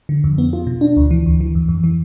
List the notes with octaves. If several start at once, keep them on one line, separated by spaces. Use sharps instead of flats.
D3
F2
B3
F4
B2
D4
D2
E3
D2
E3
F2
F2
E3